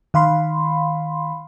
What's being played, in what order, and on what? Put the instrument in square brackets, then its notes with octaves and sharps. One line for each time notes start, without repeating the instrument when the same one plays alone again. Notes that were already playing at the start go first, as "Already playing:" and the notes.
[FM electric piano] D#3 F5 B5 C6